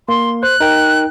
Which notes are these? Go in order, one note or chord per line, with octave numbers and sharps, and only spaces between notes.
A#3 C6
C5 F#6
D#4 A#4 G5